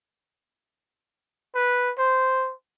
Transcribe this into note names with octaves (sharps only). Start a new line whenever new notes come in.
B4
C5